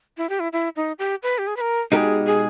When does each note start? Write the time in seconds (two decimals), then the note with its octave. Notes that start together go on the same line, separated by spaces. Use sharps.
0.18 E4
0.29 G4
0.40 E4
0.53 E4
0.76 D#4
0.99 G4
1.23 B4
1.38 G4
1.47 G#4
1.57 B4
1.61 A#4
1.92 B2 G#3 D#4 G4 G#4 A#4
2.27 G#4